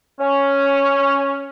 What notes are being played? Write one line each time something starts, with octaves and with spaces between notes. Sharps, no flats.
C#4